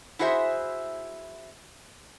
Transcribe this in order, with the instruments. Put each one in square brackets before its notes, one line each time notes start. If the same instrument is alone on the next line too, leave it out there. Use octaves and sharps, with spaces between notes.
[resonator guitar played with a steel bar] E4 F#4 G#4 C5 E5